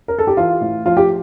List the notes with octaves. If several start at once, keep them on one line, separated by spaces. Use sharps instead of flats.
A#4
A4
G4
E3 F4
A2
F3 F4
G4